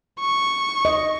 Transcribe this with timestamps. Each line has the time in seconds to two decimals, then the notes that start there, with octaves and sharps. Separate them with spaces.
0.20 C#6
0.85 D#5